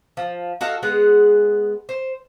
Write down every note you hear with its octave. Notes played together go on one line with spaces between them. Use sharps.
F3
F#4 A4 D#5 F5
G#3 B3 G#4 F#5
C5